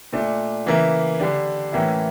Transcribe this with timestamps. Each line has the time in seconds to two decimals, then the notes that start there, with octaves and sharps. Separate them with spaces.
0.13 A#2 A3 D4
0.66 C#3 E3 A#3 E4
1.20 D3 G3 D4
1.72 A2 E3 A#3 C#4 E4